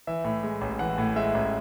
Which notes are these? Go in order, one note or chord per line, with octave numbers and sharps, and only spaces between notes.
E3 E5
A2
G#3
A1
E3 F#5
A2
G#3 E5
A1